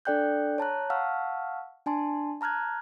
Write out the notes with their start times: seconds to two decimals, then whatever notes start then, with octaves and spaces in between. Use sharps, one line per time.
0.05 D4 A4 D5 G5 F#6 G6
0.58 C#5 A5 A#5 F#6
0.90 F5 F#5 A5 C#6 E6 F6
1.86 D4 G#5 A5 C6
2.41 A5 A#5 F6 F#6 G#6